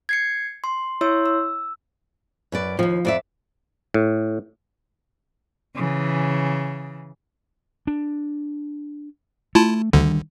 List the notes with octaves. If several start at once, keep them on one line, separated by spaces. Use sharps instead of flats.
G#6 C7 C#7
C6
E4 C#5 E5 C6 E6
E6
F#2 B4 D5
D#2 G#2 F3
F2 D5 E5
A2
C#3 E3
D4
A3 E4 F4 A5
D2 D3 D#3 G3 D4